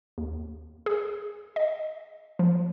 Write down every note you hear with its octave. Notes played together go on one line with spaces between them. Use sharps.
D#2
G#4
D#5
F3